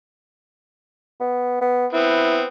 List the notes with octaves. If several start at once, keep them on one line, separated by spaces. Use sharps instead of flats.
B3
B3
B3 C4 E4